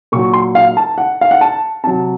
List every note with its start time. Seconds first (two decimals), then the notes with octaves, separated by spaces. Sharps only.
0.12 A#2 C#6
0.15 F#3
0.33 C6
0.55 F5
0.77 A5
0.98 F#5
1.21 F5
1.31 F#5
1.41 A5
1.84 C3 F#3 A5